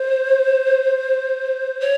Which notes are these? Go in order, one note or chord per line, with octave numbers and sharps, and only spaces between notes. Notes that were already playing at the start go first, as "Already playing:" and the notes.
Already playing: C5
C#5